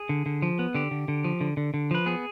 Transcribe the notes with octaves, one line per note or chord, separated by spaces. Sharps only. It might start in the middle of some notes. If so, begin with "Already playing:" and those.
Already playing: G#4
D3
D3
F3
B3
D3 G4
D3
D3
F3
D3
D3
D3
F3 B4
B3 G#4